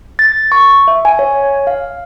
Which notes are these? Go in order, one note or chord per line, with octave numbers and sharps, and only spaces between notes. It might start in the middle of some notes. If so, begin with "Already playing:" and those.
A6
C#6
E5
G#5
C#5
F5